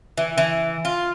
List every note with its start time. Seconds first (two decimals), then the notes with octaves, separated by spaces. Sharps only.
0.18 E3
0.38 E3
0.85 F4